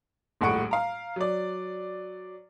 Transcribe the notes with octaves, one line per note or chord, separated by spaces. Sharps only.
D#1 A#1 A2 F#5 C#6 D7
F5 A#5
F#3 D5